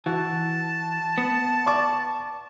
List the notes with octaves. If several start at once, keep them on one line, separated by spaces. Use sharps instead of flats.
E3 F#4 A5
B3
D5 C#6 D6